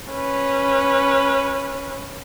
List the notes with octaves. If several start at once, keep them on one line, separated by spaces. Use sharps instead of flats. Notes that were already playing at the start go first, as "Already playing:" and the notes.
C#4 B4